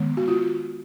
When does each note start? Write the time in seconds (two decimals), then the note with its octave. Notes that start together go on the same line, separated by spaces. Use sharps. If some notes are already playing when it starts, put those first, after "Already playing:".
Already playing: D#3 G#3 B3
0.17 F#4
0.28 F4